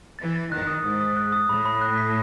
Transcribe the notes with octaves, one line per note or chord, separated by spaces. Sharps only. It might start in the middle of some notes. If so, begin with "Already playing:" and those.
E3 A6
A6
D#3 F#6
D#6
G#2 D#6
D#6
F#6
D#6
A2 B5
B5
F#6
B6